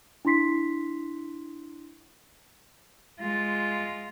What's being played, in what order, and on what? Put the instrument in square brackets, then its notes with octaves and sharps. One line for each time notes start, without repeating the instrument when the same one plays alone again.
[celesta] D4 E4 C6 B6 C7
[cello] G#3 F4